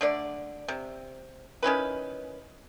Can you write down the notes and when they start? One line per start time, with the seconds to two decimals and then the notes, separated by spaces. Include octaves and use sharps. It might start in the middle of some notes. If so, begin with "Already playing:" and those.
0.01 D3 A3 D5
0.68 C3
1.63 D#3 C#4 E4 B4